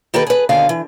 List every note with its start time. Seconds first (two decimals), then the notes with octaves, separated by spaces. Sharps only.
0.14 D#3 A#3 G4 A4 B4
0.27 G#4 B4
0.49 D#2 B2 D3 F5 G#5
0.69 E3